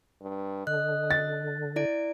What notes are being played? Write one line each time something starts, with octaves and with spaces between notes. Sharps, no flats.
G2
D3 D#5 F#6
A6
E4 D5 D7